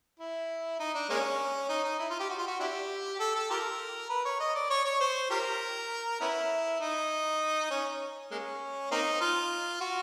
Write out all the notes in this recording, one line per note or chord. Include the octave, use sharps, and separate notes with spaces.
E4
D#4
D4
G#3 A#3 C#4
D#4
D#4
E4
F4
G4
F#4
F4
F#4
D4 E4 G4
A4
A4
F4 G4 A#4
B4
C#5
D#5
D5
C#5
C#5
C5
F4 G4 A#4
B3 C#4 E4
D#4
C#4
G#3 A#3 C#4
A#3 C4 D#4
F4
F#4